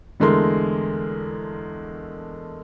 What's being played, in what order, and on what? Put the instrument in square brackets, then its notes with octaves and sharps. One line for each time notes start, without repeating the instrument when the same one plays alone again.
[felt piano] E2 D3 G#3 A3 A#4 C6